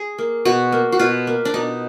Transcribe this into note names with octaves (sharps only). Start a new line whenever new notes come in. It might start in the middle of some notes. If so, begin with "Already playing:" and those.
Already playing: G#4
A#3
B2 F#4
A#3
F#4
B2 F4
A#3
D4
B2 D#4